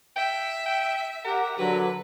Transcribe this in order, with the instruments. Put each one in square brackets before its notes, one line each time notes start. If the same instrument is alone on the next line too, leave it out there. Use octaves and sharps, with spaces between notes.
[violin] E5 [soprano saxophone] G5
[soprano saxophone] G5
[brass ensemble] G4 F#5 [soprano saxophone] A#4
[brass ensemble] D3 F#3 [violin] B4